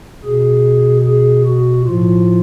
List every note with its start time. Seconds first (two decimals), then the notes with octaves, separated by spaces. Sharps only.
0.25 B2 G#4
1.06 G#4
1.46 F#4
1.86 A2 F3 F4